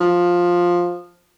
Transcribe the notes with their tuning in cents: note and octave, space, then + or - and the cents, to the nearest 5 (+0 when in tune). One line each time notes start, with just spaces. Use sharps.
F3 +10